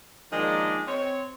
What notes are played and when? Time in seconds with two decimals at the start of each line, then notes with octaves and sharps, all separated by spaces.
0.32 D#3 F3 G#3 A#3 D4
0.88 C4 C#5